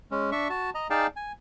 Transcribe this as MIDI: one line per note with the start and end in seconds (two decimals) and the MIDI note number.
0.11 0.30 56
0.11 0.30 61
0.32 0.48 62
0.32 0.48 76
0.32 0.48 85
0.50 0.70 66
0.50 0.70 81
0.75 0.87 75
0.75 0.87 82
0.90 1.07 63
0.90 1.07 68
0.90 1.07 74
0.90 1.07 77
0.90 1.07 79
0.90 1.07 81
1.16 1.32 80